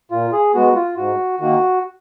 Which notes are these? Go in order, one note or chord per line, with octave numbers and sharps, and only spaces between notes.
A#2 F4
G#4
G#3 B3 F#4
F4
G#2 F#4
D#3 A#3 F#4